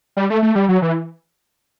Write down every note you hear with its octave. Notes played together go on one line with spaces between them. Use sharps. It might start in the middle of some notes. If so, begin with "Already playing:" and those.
G3
A3
A3
G3
F#3
E3